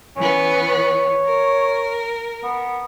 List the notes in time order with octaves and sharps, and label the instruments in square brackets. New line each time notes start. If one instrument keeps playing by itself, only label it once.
[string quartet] E3 B3 [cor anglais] C#4
[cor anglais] C#5
[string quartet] A#4
[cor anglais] B3